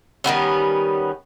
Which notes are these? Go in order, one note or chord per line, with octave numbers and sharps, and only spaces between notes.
D#3 G3 B3 C#4